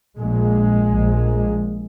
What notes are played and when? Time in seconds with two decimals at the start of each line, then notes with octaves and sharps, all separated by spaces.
0.18 A#1 A#2 G#3
0.90 A#1 A#2